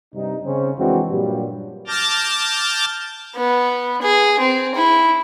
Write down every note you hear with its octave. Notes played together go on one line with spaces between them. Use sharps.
G2 C3 D#4
C#3 C4 C#4
F2 E3 G#3 C4 D4 F#4
G2 A#2 F#3 G3
A5 D6 F6 G6 A6 A#6
B3
G#4
C4
E4